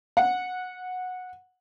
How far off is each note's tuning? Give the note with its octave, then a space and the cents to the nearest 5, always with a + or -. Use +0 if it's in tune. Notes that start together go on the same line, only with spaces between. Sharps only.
F#5 -15